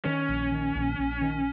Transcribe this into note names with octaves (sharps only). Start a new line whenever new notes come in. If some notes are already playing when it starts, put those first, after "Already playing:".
D#3 C#4
A#1
D#3
A#1
A#1
D#3